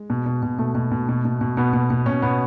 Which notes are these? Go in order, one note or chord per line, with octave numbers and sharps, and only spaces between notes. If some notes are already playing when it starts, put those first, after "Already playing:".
Already playing: G#3
B2
B2
B2
B2 A3
B2
B2
B2
B2
B2
B2 B3
B2
B2
B2 C#4
B2 B3